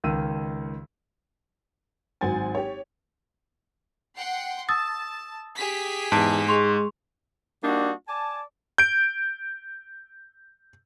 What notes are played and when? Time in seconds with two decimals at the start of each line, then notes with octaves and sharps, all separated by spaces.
0.04 C#2 D#3 E6 D#7
2.21 G#1 F#3 C5 F#5 G#5 A6
2.55 G4 C#5
4.17 F#5 G5 C6
4.69 A5 D#6 E6 A6
5.57 G4 G#4 B6
6.12 E2 G#2 A5
6.48 G#3 C6 C#6 F7
7.64 G3 A#3 D4 D#4 F#4
8.08 D5 G#5 A5
8.78 G6 D7